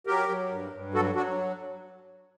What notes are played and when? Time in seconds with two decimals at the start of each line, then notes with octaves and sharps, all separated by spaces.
0.07 F#3 G4 A#4
0.29 F#3
0.50 G2
0.72 G2
0.94 F#3 F#4 A4
1.15 F#3 D4 F#4